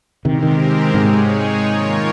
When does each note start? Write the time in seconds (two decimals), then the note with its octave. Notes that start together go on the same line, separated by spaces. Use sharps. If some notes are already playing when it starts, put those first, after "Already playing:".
0.25 C3 D#3 G#3 C4 G4 A#4
0.42 C3 D#3
0.94 G#2 C3 G#3 D#4 G#4 C#5
1.64 D#3 A#3 F4 A#4 C#5